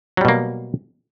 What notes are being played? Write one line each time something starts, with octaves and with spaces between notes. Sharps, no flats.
B2 F#3 G3 A#3